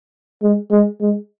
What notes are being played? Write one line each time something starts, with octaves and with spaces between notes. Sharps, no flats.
G#3
G#3
G#3